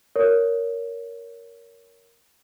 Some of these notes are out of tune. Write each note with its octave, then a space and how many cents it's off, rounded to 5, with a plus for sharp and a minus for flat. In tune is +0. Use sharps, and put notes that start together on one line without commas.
A#4 +0 C#5 +20